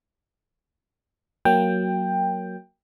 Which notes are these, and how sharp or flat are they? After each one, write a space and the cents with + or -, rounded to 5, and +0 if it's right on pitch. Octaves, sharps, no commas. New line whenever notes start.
F#3 +0 A#3 +0 G5 +10